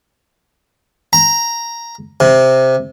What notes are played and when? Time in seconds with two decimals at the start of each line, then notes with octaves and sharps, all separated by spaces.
1.13 A#5
2.20 C3